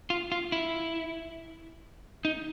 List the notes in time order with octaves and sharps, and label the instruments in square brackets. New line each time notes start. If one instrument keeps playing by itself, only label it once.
[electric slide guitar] F4
F4
E4
D#4